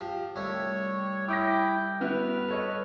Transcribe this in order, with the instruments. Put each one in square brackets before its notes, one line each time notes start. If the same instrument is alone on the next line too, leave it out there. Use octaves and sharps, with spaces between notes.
[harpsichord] F3 [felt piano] G4
[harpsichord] C2 A3 [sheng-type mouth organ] C#5
[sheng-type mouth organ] E4 G5 [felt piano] D6 D#6 A#6
[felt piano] B3 E4 F#4 [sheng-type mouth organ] B4 F6
[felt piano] A4 C#5 D#5